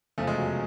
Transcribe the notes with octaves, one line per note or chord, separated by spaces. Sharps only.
F1 E2 C#3 F3 A3
G#3
F#3